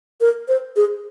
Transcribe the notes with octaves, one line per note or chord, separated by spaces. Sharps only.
A#4
C5
G#4